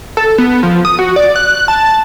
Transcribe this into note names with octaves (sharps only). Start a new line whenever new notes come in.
A4
B3
F3
D#6
F#4
D5
F#6
A5